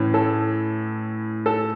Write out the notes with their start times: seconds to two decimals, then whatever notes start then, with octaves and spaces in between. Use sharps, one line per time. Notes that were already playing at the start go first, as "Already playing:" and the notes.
Already playing: A2 E3 C#4
0.14 A4
1.46 A4